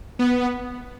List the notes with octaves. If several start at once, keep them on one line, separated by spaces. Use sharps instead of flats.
B3